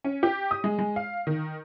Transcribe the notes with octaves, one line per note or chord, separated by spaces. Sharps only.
C#4
G4
D#6
G#3
G#3
F5
D#3